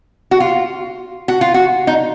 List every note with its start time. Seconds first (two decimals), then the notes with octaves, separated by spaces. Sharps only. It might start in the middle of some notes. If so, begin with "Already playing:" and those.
0.31 F#4
0.40 F4
1.28 F#4
1.41 F4
1.54 F#4
1.87 D#4